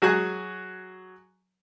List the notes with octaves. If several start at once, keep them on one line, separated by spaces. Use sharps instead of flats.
F#3 F#4 G#4 G#5 F#6